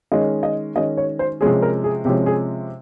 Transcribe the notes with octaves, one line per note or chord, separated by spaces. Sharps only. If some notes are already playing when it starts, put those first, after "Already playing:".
D#3 G#3 C#4 D#5
D#5
D#3 G#3 C#4 D#5
C#5
C5
C3 F3 G#3 C#4 G#4
A#4
G#4
C3 F3 G#3 C#4 G4
G#4